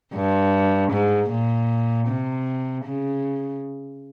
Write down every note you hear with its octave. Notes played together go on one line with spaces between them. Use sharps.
G2
G#2
A#2
C3
C#3